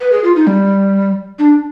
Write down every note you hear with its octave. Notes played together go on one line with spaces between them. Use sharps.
B4
G#4
F4
D#4
G3
D4